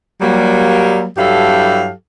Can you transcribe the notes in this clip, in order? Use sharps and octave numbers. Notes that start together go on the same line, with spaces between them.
F#3 G3 A#3
G2 F#3 E4 G4 A4 F5